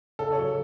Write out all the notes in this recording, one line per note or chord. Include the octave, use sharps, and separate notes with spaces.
C#3 A4
C#5
F#3